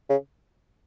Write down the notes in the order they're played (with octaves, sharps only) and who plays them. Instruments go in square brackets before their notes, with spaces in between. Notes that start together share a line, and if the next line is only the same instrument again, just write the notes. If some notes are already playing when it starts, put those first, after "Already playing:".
[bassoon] C#3